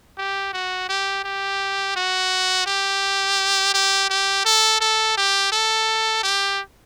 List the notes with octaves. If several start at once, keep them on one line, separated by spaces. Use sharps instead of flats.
G4
F#4
G4
G4
F#4
G4
G4
G4
A4
A4
G4
A4
G4